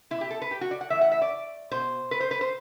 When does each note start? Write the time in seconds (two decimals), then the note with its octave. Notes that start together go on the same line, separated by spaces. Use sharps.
0.11 B2 E4
0.21 G4
0.30 A4
0.42 B4
0.51 G4
0.61 F#4
0.71 D5
0.81 F#5
0.90 A2 E3 E5
1.01 F#5
1.12 E5
1.22 D5
1.71 B2 C5
2.11 B4
2.20 C5
2.31 B4
2.41 C5